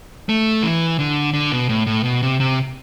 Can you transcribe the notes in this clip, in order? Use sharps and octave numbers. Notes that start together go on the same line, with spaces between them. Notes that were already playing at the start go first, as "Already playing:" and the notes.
A3
E3
D3
D3
B2
A2
A2
B2
C3
C3